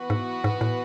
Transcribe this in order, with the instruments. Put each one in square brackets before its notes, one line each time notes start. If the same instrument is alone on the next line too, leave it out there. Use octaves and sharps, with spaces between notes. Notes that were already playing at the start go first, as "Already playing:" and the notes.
Already playing: [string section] E3 B3 F#4 B4
[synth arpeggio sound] G#2
G#2
A2